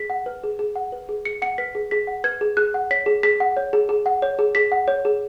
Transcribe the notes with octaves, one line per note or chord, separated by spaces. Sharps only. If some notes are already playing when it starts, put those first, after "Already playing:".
Already playing: G#4 B6
F#5
B4
G#4
G#4
F#5
B4
G#4
G#4 C#7
F#5 C#7
B4 B6
G#4
G#4 B6
F#5
B4 G#6
G#4
G#4 F#6
F#5
C#5 B6
G#4
G#4 B6
F#5
C#5
G#4
G#4
F#5
C#5
G#4
G#4 B6
F#5
C#5
G#4